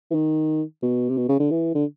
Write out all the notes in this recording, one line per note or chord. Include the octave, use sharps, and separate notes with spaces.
E3
D#3
B2
C3
B2
C#3
D3
E3
D3